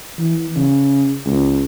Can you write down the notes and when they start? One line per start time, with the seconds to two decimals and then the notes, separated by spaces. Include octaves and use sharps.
0.19 E3
0.56 C#3
1.26 C#2